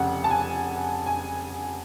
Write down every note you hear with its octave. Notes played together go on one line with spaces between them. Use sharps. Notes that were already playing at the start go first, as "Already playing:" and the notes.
Already playing: F1 F2 C#3 F#5
A5
G#5
G#5